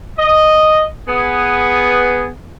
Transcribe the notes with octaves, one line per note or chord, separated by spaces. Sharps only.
D#5
B3 G#4